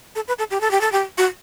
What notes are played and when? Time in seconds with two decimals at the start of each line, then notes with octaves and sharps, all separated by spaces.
0.15 A4
0.28 B4
0.39 A4
0.51 G4
0.61 A4
0.71 G4
0.81 A4
0.92 G4
1.18 F#4